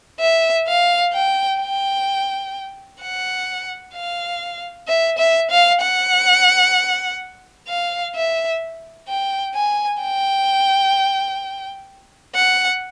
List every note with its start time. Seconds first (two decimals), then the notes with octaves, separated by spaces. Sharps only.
0.20 E5
0.68 F5
1.14 G5
1.60 G5
3.01 F#5
3.95 F5
4.88 E5
5.18 E5
5.51 F5
5.82 F#5
7.69 F5
8.15 E5
9.09 G5
9.54 G#5
10.02 G5
12.35 F#5